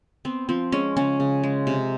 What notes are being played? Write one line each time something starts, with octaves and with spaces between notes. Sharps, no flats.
B3 C4
F3 C4
G#3 C#4
C#3 C#4
C#3
G#3
C3